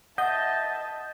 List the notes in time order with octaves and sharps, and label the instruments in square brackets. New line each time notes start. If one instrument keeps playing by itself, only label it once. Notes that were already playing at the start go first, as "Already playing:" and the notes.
[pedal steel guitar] D#5 [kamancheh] E5 A5 [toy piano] F#5 [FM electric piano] G6